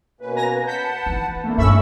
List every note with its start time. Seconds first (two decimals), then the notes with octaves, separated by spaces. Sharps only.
0.21 B2 A#3 C#4 B4
0.36 G#5 A#5 A#6
0.67 B4 F#5 A5 G6 B6
1.06 E3
1.44 A3 A#3 D4 E4
1.58 G2 C#4 A4 E5 B5 C#6 E6